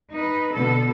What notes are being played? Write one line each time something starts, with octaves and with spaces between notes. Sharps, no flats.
D#4 B4
B2 D3 A4